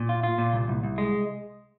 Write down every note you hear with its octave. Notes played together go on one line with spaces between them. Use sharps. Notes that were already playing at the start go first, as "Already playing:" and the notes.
Already playing: A#2
F4
F4
A#2
C2
C2
C2
G#3